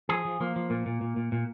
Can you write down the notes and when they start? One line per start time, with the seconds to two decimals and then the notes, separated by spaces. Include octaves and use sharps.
0.09 F3 G#4
0.25 F3
0.40 F3 A#3
0.56 F3
0.70 A#2 A#3
0.86 A#2
1.01 A#2
1.16 A#2
1.32 A#2